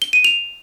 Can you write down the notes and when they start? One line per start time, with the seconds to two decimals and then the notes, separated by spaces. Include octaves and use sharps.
0.02 G7
0.13 D#7
0.24 F7